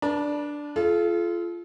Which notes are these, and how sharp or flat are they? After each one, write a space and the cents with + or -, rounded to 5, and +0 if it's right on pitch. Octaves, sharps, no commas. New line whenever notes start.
D4 +0 B4 -45 A5 -10
F4 -20 A4 -45